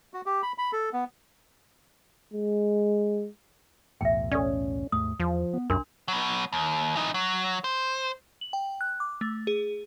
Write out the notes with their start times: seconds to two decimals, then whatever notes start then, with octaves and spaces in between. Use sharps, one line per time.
0.14 F#4
0.26 G4
0.43 B5
0.58 B5
0.73 A4
0.93 B3
2.34 G#3
4.01 B1 E2 A2 E5 G5
4.32 C#4 A4 D5
4.92 D#2 G#2 A3 D#6
5.20 E2 F3
5.53 B3
5.70 C2 F#2 D4 A#4 C6
6.08 F#3 B3
6.53 D#2
6.96 E3 D#4
7.14 F#3
7.64 C5
8.41 F#7
8.53 G5
8.81 F#6
9.00 D6
9.21 A3
9.47 G#4